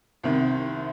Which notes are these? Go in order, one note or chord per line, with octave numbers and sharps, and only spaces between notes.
C2 C3 D#3